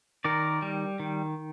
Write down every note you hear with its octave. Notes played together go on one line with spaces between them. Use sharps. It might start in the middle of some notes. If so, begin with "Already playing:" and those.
D#3 A#4 D5
G3
D#3